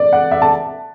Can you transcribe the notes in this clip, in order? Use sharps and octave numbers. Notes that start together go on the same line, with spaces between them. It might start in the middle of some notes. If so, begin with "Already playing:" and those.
Already playing: D5
F#5
E5
A5